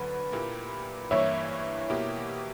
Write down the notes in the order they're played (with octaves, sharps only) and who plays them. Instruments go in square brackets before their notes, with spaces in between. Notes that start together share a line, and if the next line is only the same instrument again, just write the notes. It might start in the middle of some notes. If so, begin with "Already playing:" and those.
Already playing: [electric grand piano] D2 D3 F#3 [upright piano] B4
[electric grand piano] A#2 A#3 E4 G4
[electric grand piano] G2 E3 A#3 E4 [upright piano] C#5 E5
[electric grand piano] B2 A#3 E4 G4